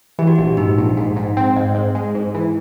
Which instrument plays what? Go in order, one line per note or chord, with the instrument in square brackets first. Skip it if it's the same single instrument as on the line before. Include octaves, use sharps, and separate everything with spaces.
[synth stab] E3 [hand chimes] G4
[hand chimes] F#4
G4
[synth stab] A#1
[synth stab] G#2 [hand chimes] D#4
[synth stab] A#1
G#2
G#2
C4
G#2
G#2
G#3
G#2
E3